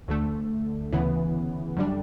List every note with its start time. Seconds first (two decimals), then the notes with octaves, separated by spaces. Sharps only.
0.08 D2 D3 A3
0.92 D2 C#3 E3 B3
1.76 F#2 D3 G3 D4